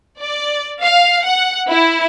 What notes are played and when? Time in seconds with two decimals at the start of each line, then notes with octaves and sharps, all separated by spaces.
0.20 D5
0.82 F5
1.25 F#5
1.68 E4